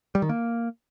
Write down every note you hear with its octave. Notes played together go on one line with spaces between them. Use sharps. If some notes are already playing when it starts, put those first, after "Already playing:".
G3
D#3
A#3